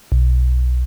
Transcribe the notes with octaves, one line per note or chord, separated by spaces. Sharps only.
B1